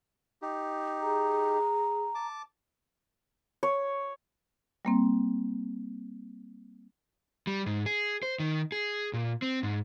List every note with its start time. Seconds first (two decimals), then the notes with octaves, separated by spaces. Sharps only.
0.42 D#4 G4
1.01 G#4 A#5
2.15 A5 D6
3.63 C#5
4.85 G3 A#3 C4
7.47 G3
7.66 G#2
7.86 G#4
8.23 C5
8.40 D#3
8.72 G#4
9.13 A#2
9.42 C4
9.63 G#2